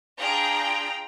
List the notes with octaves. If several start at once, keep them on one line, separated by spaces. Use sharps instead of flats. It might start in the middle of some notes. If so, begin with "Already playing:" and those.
D4 F4 G#4 G5 A#5